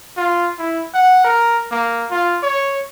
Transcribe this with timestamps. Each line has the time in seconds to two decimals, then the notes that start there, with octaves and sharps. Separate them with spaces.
0.17 F4
0.59 E4
0.94 F#5
1.24 A#4
1.71 A#3
2.11 F4
2.43 C#5